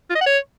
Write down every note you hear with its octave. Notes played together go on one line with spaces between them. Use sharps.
F4
D#5
F#5
C#5